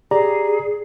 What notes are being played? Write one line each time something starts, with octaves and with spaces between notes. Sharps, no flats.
G4 G#4 D5 A#5